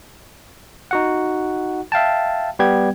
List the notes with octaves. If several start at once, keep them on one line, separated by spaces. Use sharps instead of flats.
D#4 F#4 F#5
E5 F5 G5 A5
G3 B3 G4 G5 G#6